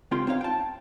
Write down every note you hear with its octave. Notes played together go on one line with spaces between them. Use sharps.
C#2 C4 F4 G4 G5 C6
C4 D#4 C#5 F5
G5 A5